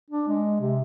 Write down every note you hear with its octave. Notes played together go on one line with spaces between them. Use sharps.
D4
G#3
C3